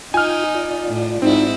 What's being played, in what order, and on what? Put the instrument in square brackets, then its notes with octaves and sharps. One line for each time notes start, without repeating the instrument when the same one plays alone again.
[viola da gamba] D#4 [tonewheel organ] F4 G5 [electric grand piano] G#5 F6
[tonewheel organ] F4 D5
[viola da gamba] A2
[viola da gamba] G#2 E4 [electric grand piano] C4 [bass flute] D#4